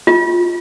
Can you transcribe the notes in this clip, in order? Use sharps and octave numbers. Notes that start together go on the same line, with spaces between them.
F4